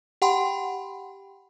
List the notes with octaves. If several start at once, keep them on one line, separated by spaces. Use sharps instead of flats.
G4 F#5 G5 B5 C6